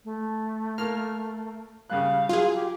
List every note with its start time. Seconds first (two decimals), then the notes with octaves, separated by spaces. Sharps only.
0.05 A3
0.78 A#3 F6
1.90 C#3 G3 F5 F#6
2.29 F#3 F4 G#4
2.54 G4